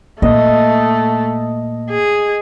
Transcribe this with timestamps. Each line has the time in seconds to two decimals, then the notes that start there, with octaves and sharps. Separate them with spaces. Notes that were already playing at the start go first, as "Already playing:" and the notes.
0.22 A#2 A3 D#5
1.90 G#4